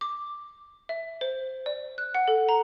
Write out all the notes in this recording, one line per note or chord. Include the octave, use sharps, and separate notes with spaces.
D6
E5
C5
D5
F#6
F#5
A4
A#5